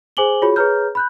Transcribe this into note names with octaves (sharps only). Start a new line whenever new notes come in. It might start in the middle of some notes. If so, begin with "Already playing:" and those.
G#4 C5 G#5 D6 F#7 G7
F4 F#4 G#4 C#5 B5
G#4 B4 C#5 A#5 F6 G6
B5 F#6 G6